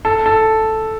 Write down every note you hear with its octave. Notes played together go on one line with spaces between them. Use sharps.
A4
A4